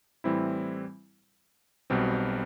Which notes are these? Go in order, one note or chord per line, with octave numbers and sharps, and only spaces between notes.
A2 E3 G3 C4 E4
B1 B2 G3 C4